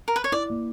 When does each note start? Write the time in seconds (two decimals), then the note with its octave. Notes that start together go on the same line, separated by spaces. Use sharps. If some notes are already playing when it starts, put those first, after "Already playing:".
0.08 A#4
0.16 B4
0.24 C#5
0.32 E4 D5
0.50 A#3